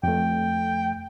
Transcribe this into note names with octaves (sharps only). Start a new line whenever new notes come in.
F2 A3 G5